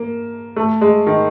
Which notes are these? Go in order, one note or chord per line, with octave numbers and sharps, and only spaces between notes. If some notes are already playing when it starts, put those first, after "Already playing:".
Already playing: A#3
A3
G#3
D#3